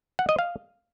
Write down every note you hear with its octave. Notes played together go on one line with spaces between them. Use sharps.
F#5
D#5
F5